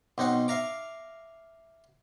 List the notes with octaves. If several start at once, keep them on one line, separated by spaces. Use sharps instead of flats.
B1 C4 D#4 F#5
E5 F5 A#5 D6